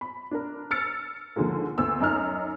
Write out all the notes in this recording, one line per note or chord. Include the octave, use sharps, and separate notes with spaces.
B5
D4 A#4
E6 F6 A6 C#7
D#2 D3 F3 G#3 A#3
D2 B3 E6
F#2 D#4 A#5 F6